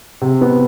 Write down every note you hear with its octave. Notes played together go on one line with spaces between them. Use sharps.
C3
B3